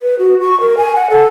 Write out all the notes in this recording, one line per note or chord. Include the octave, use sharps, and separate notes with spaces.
B4
F#4
C#6
A#4
G#5
F#5
A4